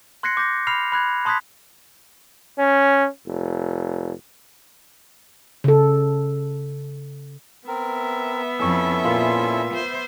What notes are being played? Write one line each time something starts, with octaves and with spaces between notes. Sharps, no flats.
C6 F#6 G#6 A#6 C7 C#7
D6 G6 A#6
B5 F6 C7 F7
B5 F#6 G#6
A5 C6 D#6 F#6 G#6 B6
C#4
F1
C#3 A4
B3 C4 A#4 E5
F2 C#4 E4 A4 C#6 E6
A#2 F4 A#4 C6
C5